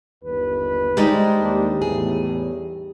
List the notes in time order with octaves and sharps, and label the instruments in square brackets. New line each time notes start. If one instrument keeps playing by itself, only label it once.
[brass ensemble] G1 D#2 B4
[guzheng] G3 D#4 [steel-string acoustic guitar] G#3 C5
[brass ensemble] D#2 D4
[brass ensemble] E2 A2 [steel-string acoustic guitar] G#4